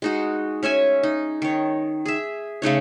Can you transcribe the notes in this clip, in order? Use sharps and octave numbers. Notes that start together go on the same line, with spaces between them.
G#3 D#4 F#4
C#4 C#5 E5 G#5
D#4
D#3 C#5
G#4 E5
C#3 A3 D#4 C#5